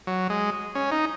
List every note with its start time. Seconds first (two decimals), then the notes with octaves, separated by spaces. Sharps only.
0.07 F#3
0.30 G#3
0.75 C#4
0.92 D#4